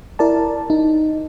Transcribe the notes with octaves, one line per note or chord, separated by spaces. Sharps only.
E4 A#4 D5 A5
D#4